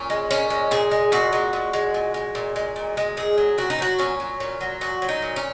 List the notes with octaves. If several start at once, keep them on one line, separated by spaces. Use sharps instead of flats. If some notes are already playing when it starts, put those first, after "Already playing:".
Already playing: A#2 C#4
G#3
A#2 C#4
G#3
A#2 G#4
G#3
A#2 F#4
G#3
A#2
G#3
A#2
G#3
A#2
G#3
A#2
G#3
A#2 G#4
F#3
A#2 F#4
D#4
F#3 F#4
A#2 C#4
F#3
A#2 C#4
F#3
A#2 F#4
F#3
D#4
A#2
C#4